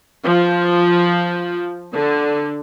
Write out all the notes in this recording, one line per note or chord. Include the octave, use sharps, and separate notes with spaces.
F3
D3